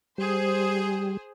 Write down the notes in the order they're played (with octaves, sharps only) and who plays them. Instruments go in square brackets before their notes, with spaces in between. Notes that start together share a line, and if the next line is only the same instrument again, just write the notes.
[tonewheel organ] G3 [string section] G#4 C5